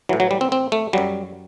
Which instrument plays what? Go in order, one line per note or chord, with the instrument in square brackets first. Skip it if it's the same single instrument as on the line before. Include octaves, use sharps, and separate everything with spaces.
[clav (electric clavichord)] A2 E3 F#3
F#3
G3
C4
C4
A3
F#2 F#3 G3